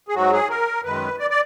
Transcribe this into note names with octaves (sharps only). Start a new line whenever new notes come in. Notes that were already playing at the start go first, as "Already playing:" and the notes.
G#4
G#2 F#3 F#4
G#4
A#4
F#2 D#3 G#3 B4
D5
D5